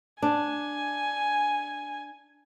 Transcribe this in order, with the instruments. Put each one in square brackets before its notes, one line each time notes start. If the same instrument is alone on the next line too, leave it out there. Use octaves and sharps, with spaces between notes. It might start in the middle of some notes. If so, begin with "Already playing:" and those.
[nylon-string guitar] D4 [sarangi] G#5